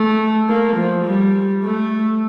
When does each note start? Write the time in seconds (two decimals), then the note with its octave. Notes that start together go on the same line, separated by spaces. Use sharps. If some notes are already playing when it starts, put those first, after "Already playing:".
Already playing: A3
0.49 A#3
0.77 F3
1.05 G3
1.64 A3